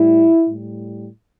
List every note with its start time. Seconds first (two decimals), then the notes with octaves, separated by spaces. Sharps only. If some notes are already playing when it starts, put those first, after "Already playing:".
Already playing: A2 G3 E4
0.46 A2 G3